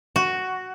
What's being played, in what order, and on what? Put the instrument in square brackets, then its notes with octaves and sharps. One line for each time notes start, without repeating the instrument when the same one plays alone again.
[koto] F#4